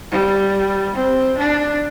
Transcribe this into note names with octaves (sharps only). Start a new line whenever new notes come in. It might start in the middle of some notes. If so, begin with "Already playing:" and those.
G3
C4
D4